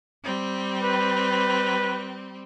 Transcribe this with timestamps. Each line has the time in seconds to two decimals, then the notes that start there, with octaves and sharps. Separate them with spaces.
0.23 G3 C4
0.83 B4